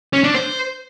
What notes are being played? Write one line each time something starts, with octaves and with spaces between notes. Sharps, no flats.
C#4
D4
C5